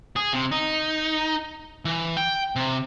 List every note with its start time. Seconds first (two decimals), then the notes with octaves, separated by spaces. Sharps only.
0.16 G#4
0.33 C3
0.52 D#4
1.85 E3
2.17 G5
2.56 C3